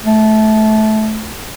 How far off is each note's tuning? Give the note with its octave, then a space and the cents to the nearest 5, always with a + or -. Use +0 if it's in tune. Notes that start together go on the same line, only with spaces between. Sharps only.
A3 -20